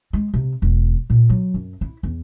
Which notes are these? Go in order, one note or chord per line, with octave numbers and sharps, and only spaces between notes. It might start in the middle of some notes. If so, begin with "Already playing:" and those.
G#3
C3
E1
A#2
F#3
F#2
E4
E2